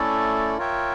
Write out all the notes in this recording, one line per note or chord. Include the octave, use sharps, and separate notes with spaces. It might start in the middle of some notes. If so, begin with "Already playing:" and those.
Already playing: A3 C#4 E4 A4 D5
F4 A#4 C#5 E5 G5